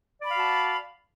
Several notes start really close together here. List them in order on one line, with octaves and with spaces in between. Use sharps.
D5 B5 F5 F#4 A5